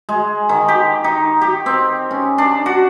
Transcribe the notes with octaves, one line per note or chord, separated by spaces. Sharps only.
G#3
D#3
G4
D#4
G4
C4
C#4
D4
F#4